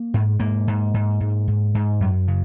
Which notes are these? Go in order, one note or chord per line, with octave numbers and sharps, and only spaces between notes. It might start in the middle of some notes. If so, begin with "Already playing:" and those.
Already playing: A#3
G#2
G#2 A#3
G#2
G#2
G#2
G#2
G#2
F#2
C#3